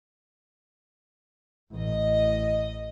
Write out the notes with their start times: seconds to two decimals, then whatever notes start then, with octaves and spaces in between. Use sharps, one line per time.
1.73 A1 D#5